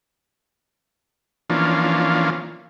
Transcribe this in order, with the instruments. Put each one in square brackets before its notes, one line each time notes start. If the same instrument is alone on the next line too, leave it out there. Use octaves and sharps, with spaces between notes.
[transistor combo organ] E3 F3 A#3 C#4 D4 F4